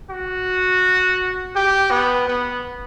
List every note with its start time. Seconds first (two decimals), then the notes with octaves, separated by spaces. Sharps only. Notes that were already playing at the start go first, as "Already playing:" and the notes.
0.10 F#4
1.55 G4
1.91 B3
2.28 B3